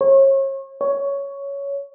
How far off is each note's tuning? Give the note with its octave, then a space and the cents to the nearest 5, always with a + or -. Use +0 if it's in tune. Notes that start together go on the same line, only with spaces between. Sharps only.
C#5 -35
C#5 +10